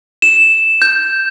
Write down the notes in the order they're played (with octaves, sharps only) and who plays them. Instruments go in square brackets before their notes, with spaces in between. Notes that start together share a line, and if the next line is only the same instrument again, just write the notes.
[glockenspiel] E7
G6